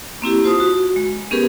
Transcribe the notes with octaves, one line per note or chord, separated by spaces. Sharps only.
A#3 C4 E4 G4
F4 C5 A5 D#6
F#4
G#3
B3 C#4 G4 G#4 A#4 B4